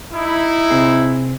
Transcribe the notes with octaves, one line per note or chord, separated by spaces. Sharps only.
D#4 E4
C3 C4 G#4